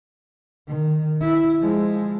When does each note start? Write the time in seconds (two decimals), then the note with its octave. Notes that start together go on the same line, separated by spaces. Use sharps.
0.68 D#3
1.21 E4
1.61 F3 G#3